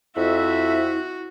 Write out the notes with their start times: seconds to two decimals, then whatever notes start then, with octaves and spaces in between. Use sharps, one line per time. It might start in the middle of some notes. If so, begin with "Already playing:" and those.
0.16 F2 E4 F#4 E5